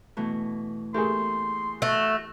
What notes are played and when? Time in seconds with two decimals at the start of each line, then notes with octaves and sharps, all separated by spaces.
0.17 B2 E3 A3
0.94 A3 A#3 G4 G#4 A#4 E5 C6
1.82 A3 F#4